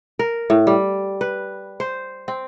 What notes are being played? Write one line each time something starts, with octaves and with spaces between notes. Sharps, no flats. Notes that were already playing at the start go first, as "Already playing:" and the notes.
A#4
A2
G3
B4
C5
C4